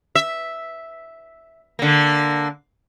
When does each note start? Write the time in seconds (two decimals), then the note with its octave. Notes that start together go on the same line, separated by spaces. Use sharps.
0.15 E5
1.79 D3 A#3